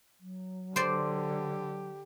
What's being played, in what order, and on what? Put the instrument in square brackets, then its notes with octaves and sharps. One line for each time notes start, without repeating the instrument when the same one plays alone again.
[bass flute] F#3
[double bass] D3 [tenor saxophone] G4 [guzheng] C5 D5